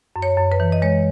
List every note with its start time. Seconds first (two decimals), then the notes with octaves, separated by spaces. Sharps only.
0.16 F#2
0.22 C#5
0.37 F#2
0.52 B4
0.60 E3
0.72 D#5
0.82 G#3 C#5